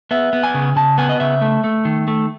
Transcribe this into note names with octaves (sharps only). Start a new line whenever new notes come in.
B3 E5
B3
G#5
C#3
C#3 A5
B3 G#5
D#5
C#3 E5
A3
A3
D#3
A3